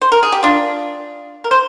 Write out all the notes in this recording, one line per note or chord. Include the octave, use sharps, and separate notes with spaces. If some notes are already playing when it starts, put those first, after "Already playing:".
C5
A#4
G#4
G4
D4 F4
A#4
C5